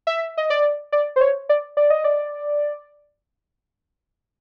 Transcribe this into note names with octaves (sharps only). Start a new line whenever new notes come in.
E5
D#5
D5
D5
C5
C#5
D5
D5
D#5
D5